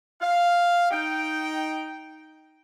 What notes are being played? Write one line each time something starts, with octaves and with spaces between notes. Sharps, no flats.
F5
D#4 G5